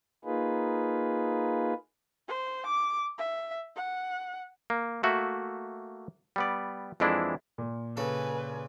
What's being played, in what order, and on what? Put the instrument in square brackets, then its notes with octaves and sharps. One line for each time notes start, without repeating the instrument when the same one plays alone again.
[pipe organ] A#3 D#4 F4 G#4 B4
[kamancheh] C5
D6
E5
F#5
[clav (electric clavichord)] A#3
A3 A#3 F#4 E5
G3 B3 D5
F2 E3 G#3 D4 E4
[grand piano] A#2
[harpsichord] C#3 A4 [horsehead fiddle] B4 G#5